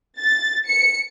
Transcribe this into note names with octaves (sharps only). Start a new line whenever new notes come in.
A6
C#7